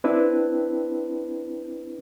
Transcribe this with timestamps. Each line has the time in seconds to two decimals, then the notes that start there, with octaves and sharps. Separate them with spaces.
0.04 C4 D4 E4 B4